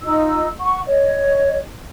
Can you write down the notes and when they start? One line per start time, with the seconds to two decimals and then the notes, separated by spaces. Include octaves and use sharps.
0.01 D#4 F4 E6
0.61 F#5 C#6
0.87 C#5 D#5